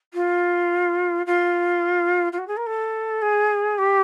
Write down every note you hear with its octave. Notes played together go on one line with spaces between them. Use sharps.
F4
F4
F4
F#4
G#4
A#4
A4
G#4
G4